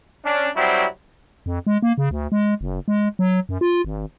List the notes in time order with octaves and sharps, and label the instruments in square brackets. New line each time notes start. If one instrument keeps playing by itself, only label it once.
[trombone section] C#4 D4
F#3 G3 C4 E4 F#4
[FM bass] F2
G#3
A#3
C#3
D2
G#3
F#1
G#3
F#3
F#2
F4
G#1